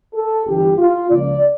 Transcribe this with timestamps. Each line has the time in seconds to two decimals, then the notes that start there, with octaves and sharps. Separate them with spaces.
0.14 A4
0.46 G1 G2 E3 G4
0.78 F4
1.10 C#2 C#3 F3 A#3 D5